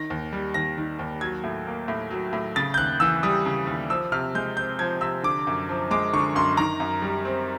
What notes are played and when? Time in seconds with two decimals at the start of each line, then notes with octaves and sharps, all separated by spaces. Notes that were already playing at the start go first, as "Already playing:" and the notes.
Already playing: D#3 A#6
0.10 D#2
0.33 G3
0.54 D#2 A#6
0.78 D#3
0.99 D#2
1.21 F#3 G#6
1.44 A2
1.67 A#3
1.88 A2
2.10 F#3
2.33 A2
2.56 C#3 A6
2.74 G6
2.78 D#2 F#6
3.00 E3 E6
3.23 G3 D#6
3.46 C#3
3.67 D#2
3.90 F3 E6
4.12 C3 F6
4.35 G#3 G6
4.57 C4 G6
4.79 F3 G#6
5.01 C3 E6
5.23 D3 D6
5.47 F#2
5.69 F3
5.91 G#3 D6
6.13 D3 C#6
6.35 F#2 C6
6.57 D#3 A#5
6.80 F#2
7.02 G3
7.25 C4